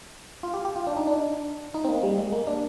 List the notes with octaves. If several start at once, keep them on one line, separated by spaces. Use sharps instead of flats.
F4
G4
G4
F4
D4
D#4
D4
D#4
C4
A#3
G3
G#3
A#3
D4